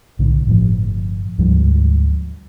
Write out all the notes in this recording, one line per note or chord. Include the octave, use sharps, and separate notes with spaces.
B1 A2 D3
G1 A2 F3
D2 G#2 F3 G3